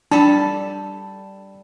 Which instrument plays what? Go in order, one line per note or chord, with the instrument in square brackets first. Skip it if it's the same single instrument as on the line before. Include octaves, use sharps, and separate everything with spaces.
[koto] G3 A4 [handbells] D4 [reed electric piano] A5 B5